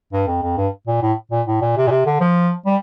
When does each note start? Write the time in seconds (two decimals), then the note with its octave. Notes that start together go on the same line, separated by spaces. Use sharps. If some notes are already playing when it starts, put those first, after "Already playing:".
0.13 G2
0.27 F2
0.42 F2
0.57 G2
0.87 A#2
1.02 A2
1.31 A#2
1.47 A2
1.62 A#2
1.77 C3
1.87 A#2
1.91 C3
2.06 D3
2.21 F3
2.66 G3